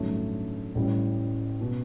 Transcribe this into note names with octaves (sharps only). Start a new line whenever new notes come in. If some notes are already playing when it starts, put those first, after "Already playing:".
Already playing: A1 G2 D#3 F#3 A3
A1 A2 G3
B2